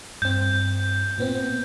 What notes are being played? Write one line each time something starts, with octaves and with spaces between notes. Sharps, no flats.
G2 C4 G6
A#2 B3 C4